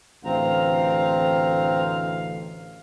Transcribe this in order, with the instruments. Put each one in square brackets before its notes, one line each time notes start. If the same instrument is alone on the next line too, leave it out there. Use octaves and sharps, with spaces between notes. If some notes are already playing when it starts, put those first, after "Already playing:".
[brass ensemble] A1 D2 F5 [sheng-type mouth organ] C4 A#5